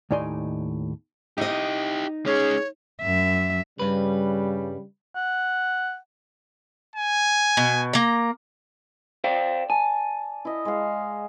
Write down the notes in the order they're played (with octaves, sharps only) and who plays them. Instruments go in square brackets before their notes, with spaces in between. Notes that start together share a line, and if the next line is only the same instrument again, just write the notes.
[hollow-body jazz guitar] D#2 A2 D#4 D5 G#5 C6
[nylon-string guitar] D#4 D#5 [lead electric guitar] E4 G4
[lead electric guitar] G#3 C#4 [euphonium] G#4 [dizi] C#5
[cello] F#2 E5
[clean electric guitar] G2 B4 [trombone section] C#3 G3
[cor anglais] F#5
[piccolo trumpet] G#5
[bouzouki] B2
A#3 A#5
[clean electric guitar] C5 F5 G5 [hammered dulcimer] D5
[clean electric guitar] G#5 [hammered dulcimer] A5
[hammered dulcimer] E4 D#5
G#3 F5